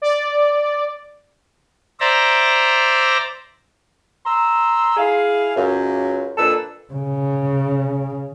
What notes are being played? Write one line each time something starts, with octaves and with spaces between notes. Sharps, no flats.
D5
C5 D5 E5 A#5
A#5 C6 E6
E4 G#4 F5
C#2 F#2
F2 A#2 D4 A4 B4 E6
C#3